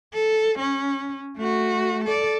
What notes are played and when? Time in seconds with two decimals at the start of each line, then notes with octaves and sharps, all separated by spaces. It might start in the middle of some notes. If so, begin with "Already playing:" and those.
0.14 A4
0.59 C#4
1.37 A3 F#4
2.05 A4 D5